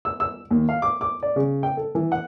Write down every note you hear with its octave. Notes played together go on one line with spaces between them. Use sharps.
E6
E6
D#2
F5
D6
D6
D5
C#3
G5
A4
E3
F#5